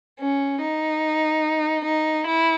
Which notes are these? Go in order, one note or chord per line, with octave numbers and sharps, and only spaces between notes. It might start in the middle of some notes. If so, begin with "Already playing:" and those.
C#4
D#4
D#4
E4